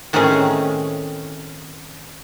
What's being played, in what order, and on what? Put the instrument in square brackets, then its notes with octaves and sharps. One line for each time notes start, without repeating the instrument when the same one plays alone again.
[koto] A2 D#3 A3 C4 C#4 G#4